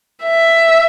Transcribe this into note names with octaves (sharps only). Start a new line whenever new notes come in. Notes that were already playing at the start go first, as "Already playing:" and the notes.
E5